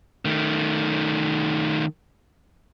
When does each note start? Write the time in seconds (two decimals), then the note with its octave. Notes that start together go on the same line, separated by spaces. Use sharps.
0.25 D#3 A3